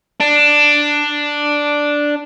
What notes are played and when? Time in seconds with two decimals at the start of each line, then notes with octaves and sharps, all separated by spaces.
0.20 D4